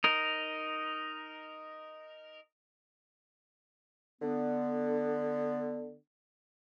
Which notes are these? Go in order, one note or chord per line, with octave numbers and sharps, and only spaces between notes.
D#4 A#4
D3 B3